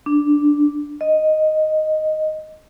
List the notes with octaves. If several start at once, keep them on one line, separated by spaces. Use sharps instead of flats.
D4
D#5